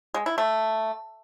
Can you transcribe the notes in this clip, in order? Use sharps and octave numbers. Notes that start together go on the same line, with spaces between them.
G#3
E4
A3